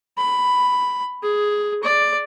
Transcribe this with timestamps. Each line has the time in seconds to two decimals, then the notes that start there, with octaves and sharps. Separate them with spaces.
0.18 B5
1.23 G#4
1.83 D5